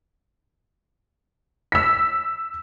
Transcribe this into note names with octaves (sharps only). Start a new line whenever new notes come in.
E6 B6